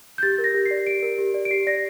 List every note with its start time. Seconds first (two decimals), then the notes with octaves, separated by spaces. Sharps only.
0.18 G6
0.23 G4 A6
0.38 A#4
0.44 A#6
0.54 G4
0.66 C7
0.71 D5
0.87 G4 D7
1.03 A#4
1.18 G4
1.34 D5
1.45 D7
1.51 G4 C7
1.67 D5 A#6